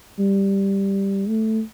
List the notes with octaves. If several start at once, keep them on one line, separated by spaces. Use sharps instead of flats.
G3
A3